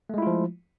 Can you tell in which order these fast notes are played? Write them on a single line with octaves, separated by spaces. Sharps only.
A3 G#3 E4 F4 F3